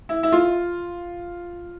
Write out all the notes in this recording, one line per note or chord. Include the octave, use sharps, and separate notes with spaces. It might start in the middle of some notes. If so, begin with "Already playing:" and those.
E4
E4
F4